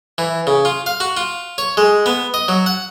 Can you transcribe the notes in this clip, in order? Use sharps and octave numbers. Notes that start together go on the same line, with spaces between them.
E3
C#3
F4
F5
F#4
F4
C#5
G#3
B3
D#5
F#3
F#5